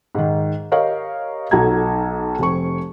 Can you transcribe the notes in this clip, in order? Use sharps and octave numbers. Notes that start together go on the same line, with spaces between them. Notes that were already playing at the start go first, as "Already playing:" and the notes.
G#2 D#3
G4 A#4 C#5 D#5 F5
B1 F#3 D#4 A4 A#5 G#6
F1 C4 C#6